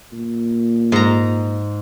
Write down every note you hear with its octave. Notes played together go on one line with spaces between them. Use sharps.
A#2
G#2 A#5